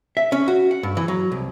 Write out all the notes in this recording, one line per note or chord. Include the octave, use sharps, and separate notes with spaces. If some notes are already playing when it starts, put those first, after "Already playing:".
E5
C#4
F#4
F#5
G2
E3
F#3
C2